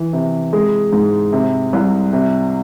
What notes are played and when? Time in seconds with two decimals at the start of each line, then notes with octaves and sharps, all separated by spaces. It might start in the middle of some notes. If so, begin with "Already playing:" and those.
Already playing: E3
0.13 C3
0.53 G#3
0.92 G#2
1.33 C3
1.73 C2
2.13 C3